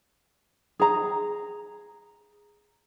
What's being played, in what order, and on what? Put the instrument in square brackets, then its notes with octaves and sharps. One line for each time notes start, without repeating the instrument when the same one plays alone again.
[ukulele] G#4 A#5